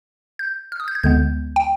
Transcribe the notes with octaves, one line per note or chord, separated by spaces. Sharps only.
G6
F6
D#6
G6
G#6
D2 D3 G#3 B3 G6
G5